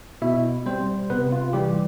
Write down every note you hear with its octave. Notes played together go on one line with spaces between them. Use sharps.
B2 E4 E5
G3 C4 C5
C3 B3 B4
F4
E3 G3 G4